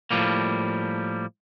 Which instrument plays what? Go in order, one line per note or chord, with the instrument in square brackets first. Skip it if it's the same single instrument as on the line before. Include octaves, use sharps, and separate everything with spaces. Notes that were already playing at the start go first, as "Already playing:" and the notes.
[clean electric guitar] A2 F3 G3 A#3